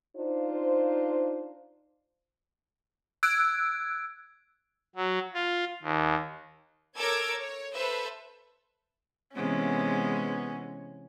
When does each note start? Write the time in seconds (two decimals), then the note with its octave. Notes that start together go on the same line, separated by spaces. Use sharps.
0.16 D4 D#4 F4 C5
3.23 E6 F#6 G#6 D7
4.96 F#3
5.34 F4
5.82 D#2
6.97 A4 A#4 C#5 D6 E6 G#6
7.38 C#5
7.75 A4 B4 C5 E5
9.36 C3 E3 G#3 B3 C#4